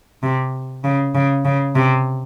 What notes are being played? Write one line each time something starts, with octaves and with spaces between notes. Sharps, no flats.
C3
C#3
C#3
C#3
C3